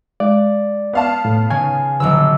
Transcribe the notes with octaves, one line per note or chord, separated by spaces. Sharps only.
G#3 D5
B3 F5 A5
A2
C#3 G#5
A#1 D3 F#3 E6